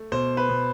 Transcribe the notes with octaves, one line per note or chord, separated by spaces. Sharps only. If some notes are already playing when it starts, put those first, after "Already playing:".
Already playing: A3
B2 C5
B4
B2